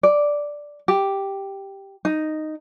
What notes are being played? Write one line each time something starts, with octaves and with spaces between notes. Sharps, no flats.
D5
G4
D#4